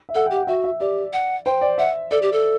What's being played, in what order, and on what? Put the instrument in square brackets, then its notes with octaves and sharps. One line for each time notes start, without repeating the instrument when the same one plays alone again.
[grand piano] E5
[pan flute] A4 [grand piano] F#5
[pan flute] G4 [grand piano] G5
[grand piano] F#5
[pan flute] F#4 [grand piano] E5
[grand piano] E5
[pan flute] G4 [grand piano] D5
[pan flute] F#5
[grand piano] C5 [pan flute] G5
[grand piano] D5
[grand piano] E5 [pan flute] F#5
[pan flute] A4 [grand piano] D5
[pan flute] G4
A4